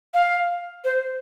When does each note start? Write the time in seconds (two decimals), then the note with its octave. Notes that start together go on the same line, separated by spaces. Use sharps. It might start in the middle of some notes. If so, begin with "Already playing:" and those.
0.14 F5
0.84 C5